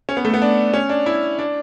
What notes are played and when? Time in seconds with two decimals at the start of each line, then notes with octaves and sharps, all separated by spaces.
0.09 C#4
0.17 B3
0.25 A3
0.34 B3
0.42 D4
0.74 C#4
0.89 D4
1.06 E4
1.39 D4